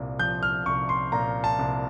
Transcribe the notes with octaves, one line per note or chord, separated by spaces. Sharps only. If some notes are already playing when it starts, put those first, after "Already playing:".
Already playing: C2 A#2
F3 G6
F6
C2 C#6
C6
A#2 A#5
A5
C2